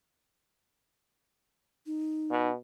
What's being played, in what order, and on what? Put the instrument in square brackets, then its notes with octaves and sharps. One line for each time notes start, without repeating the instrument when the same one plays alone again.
[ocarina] D#4
[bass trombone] B2